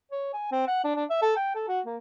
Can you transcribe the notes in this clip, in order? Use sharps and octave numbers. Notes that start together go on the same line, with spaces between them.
C#5
G#5
C4
F#5
D4
D4
E5
A4
G5
A4
F#4
A#3